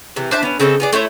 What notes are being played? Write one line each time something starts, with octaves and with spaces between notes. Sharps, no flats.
C3 E3
D4 C5 E5 A5
B3 C#4
C#3 C4 A4 D#5
B3 G#4 D5
A3 E4 C5 C#5